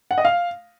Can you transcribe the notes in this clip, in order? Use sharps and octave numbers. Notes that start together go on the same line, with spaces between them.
F#5
D#5
F5